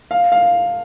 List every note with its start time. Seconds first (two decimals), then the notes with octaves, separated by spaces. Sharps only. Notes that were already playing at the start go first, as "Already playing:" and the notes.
0.11 F5
0.32 F5